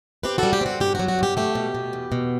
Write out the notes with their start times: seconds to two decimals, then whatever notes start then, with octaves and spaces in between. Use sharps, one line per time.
0.23 C4 G4 B4
0.38 G3 F#4 A4
0.53 G4
0.61 C4 F#4
0.80 G2 G4
0.95 F#3 F#4
1.08 F#4
1.19 G2 G4
1.37 A3 G4
1.55 B2
1.75 B2
1.93 E2
2.12 B2